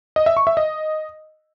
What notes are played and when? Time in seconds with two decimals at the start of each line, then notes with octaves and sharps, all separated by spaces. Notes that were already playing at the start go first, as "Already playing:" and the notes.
0.16 D#5
0.26 E5
0.37 C#6
0.47 E5
0.57 D#5